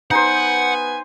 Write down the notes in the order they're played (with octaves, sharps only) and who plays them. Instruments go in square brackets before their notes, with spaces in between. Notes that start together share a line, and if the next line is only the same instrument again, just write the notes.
[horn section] B3 B4 G#5 [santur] D#4 C5 [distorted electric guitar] F#5